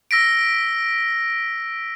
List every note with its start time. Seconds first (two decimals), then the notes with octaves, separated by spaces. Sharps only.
0.11 E6 A#6 B6 D7